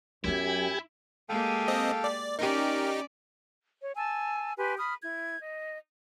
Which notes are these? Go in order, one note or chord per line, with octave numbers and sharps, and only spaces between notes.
F#2 F#3 B3 E4 G4 G#5
G#3 A#3 G4 A4 F5 G5
C4 D#5
D5
C#4 D#4 G4 A#4 D5 F6
C#5
G#5 A5 E6
G4 B4 G#5 C6
B5 D#6 F6
E4 G#6
D#5